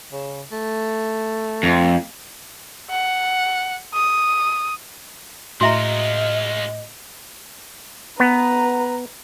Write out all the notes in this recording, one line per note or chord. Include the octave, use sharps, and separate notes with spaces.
C#3
A3
F2
F#5
D#6
A2 G#3 F4 F#4 D#5 E5 A#5
B3 B4 A#5